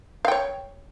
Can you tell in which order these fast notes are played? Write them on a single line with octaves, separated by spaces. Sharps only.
F5 G5 C#5